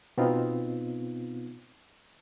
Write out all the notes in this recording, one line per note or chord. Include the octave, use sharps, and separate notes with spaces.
B2 B3 C4 D#4 F4